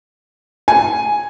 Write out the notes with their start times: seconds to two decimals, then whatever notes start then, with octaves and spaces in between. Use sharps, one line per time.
0.68 G#5